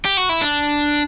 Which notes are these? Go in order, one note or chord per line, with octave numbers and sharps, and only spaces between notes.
G4
F#4
E4
D4